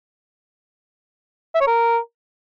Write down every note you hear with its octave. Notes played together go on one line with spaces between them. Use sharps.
E5
C#5
A#4